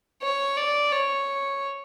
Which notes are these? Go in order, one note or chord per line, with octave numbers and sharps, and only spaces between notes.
C#5
D5
C#5